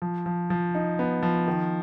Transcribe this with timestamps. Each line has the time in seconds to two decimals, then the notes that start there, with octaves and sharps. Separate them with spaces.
0.02 F3
0.26 F3
0.50 F3
0.75 D#4
0.99 B3
1.23 F3
1.48 D#3